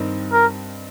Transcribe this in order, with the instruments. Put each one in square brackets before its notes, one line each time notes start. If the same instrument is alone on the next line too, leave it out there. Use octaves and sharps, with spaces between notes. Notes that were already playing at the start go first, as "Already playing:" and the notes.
Already playing: [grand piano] G2 D#3 G3 C4 D#4
[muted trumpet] A#4